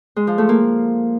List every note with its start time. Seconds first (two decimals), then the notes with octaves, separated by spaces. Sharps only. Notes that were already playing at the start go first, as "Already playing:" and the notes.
0.16 G#3
0.27 F3
0.38 A3
0.49 A#3